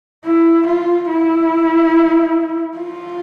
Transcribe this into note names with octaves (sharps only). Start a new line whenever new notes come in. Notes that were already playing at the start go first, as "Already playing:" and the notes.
E4
F4
E4
F4